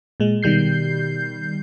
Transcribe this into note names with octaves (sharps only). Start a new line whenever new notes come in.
A#2 G#3
B2 D#3 G3 G6 C7